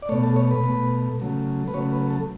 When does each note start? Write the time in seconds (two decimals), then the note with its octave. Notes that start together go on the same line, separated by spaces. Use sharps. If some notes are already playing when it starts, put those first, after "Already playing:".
0.02 D5
0.09 A3 C#5
0.12 B2
0.23 A4
0.36 C#5
0.51 B4
0.64 B2 A3
1.20 C#3 F#3 A3
1.68 B4
1.74 C#3 F#3 A3 C#5
1.92 B4
2.10 A4